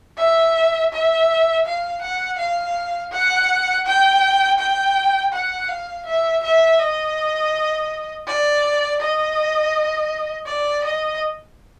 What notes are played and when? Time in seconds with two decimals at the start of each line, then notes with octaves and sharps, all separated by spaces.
0.18 E5
0.92 E5
1.66 F5
2.02 F#5
2.38 F5
3.12 F#5
3.86 G5
4.59 G5
5.33 F#5
5.69 F5
6.06 E5
6.43 E5
6.79 D#5
8.27 D5
9.00 D#5
10.46 D5
10.84 D#5